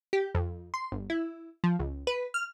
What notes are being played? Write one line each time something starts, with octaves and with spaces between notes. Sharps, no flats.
G4
F2
C6
G1
E4
F3
C#2
B4
F6